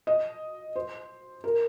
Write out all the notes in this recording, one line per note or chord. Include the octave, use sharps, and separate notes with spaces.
D#5
C5
A#4